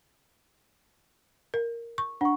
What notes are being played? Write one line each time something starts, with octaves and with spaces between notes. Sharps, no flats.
A#4
C#6
D4 F#5 C#6